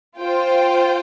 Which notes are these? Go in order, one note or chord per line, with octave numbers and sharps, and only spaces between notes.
F4 C5 G5